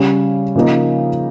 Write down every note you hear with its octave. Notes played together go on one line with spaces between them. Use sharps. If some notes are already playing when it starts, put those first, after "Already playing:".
Already playing: C#3 G3 C#4
C#3 F3 A#3 D#4